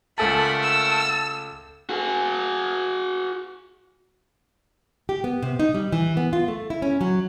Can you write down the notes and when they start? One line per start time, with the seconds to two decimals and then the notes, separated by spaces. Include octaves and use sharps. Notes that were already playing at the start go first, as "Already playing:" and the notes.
0.18 C#2 A3 A4 A#4 F#5 G#5 A5 B5
0.63 E6
1.89 F#4 G#4
5.09 G4
5.24 B3
5.43 C3
5.60 D#4
5.75 G3
5.92 E3
6.17 B3
6.33 F4
6.48 A3
6.70 E4
6.82 C#4
7.01 F#3